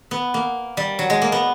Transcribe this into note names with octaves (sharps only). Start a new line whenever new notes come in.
B3
A#3
G3
F#3
G#3
A#3
B3